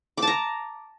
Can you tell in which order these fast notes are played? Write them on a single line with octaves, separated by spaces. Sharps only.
D6 A5 A#5